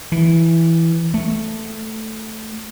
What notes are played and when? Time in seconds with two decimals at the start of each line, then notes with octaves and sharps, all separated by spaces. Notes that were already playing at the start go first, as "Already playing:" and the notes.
0.12 E3
1.14 A3